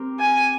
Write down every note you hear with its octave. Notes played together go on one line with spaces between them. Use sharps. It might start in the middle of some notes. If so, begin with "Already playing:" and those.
Already playing: C4 G4 A#4
G#5